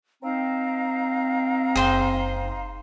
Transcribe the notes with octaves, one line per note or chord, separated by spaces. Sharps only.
C4 D#4 F5 A#5
F#1 G#4 C5 G5